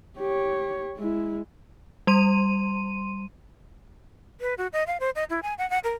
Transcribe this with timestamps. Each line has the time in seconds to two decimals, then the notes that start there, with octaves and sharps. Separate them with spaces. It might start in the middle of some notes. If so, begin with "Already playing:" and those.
0.17 G4 C#5
0.98 G#3 E4
2.07 G3 C6 D#7
4.41 B4
4.58 F#4
4.73 D#5
4.87 F5
5.00 C5
5.15 D#5
5.30 E4
5.43 G#5
5.58 F#5
5.70 F#5
5.84 A#4